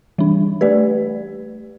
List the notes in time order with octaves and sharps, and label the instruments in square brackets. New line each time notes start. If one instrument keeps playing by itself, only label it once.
[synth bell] E3 G3 D4
A3 G4 B4 D5